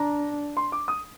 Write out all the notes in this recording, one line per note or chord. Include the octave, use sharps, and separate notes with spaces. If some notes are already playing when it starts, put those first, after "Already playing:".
Already playing: D4 A#5
C6
D6
D#6